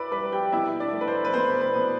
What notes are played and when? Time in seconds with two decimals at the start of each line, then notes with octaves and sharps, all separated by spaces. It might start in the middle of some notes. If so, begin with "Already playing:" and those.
Already playing: E4 B4 D5 E5 B5 D6 E6
0.12 G3 B4 B5
0.32 G4 G5
0.52 B2 E4 E5
0.80 D4 D5
0.93 A3
1.01 B4
1.08 C5
1.25 B4
1.34 B2 C5
1.61 B4
1.75 B2